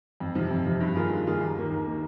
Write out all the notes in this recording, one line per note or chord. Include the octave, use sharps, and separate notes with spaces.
F2
C3 F3
F2
C3 F3
G2
D#3 A#3 F4 G#4
G2
D#3 A#3 F4 G#4
D#2
D#3 A#3
D#2
D#3 A#3